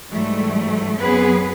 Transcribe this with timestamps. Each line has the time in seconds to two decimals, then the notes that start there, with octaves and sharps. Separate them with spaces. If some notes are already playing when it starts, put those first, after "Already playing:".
0.11 G#2 E3 F#3 G3 A3
0.99 F#2 F#3 B3 C4 G#4 B4